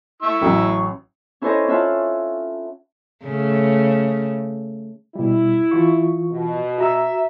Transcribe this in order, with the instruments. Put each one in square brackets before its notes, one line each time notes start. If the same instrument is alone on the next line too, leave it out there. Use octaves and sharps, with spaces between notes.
[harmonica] E4 C#6 E6
[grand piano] A1 F#3
[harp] C#4 E4 A4 C5 C#5 D#5
C#4 F4 E5 F#5 A5
[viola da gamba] C#3 A3
[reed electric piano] B2 G3 [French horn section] E4
[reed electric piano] E3 F4 C#6
[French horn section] B2
[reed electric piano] F#4 A#5 E6 [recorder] E5